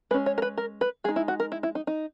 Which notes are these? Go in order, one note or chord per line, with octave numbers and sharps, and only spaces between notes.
G#3 C#4 B4
C#5
A#4
B4
A#4
B4
G#3 D#4 G#4
E4
F#4
A#4
E4
E4
D#4
D#4